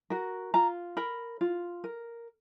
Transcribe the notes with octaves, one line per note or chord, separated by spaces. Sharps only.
F#4 A#4
F4 A#5
A#4 B5
F4
A#4